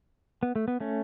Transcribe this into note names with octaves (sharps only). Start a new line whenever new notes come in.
B3
A3
B3
A3 C#4